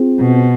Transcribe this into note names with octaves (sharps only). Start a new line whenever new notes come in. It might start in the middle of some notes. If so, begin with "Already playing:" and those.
Already playing: C4 F4 G#4 C5
B2